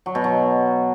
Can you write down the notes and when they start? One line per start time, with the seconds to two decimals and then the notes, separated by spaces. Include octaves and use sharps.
0.06 F#3
0.15 B2
0.24 F#3